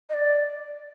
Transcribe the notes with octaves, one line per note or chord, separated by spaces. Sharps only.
D#5
D5